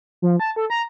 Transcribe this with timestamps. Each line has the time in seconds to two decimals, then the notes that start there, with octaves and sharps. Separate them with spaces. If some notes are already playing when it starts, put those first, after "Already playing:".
0.22 F3
0.40 A5
0.56 A4
0.70 A#5